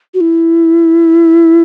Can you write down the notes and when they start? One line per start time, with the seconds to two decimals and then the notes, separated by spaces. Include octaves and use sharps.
0.14 F#4
0.21 E4